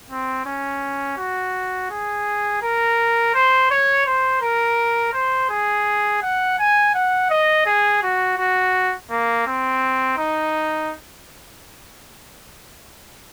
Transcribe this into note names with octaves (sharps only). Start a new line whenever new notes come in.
C4
C#4
F#4
G#4
A#4
C5
C#5
C5
A#4
C5
G#4
F#5
G#5
F#5
D#5
G#4
F#4
F#4
A#3
C4
D#4